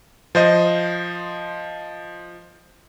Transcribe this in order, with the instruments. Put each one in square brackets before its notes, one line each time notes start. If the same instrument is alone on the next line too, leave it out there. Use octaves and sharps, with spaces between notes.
[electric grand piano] F3 C5 D#5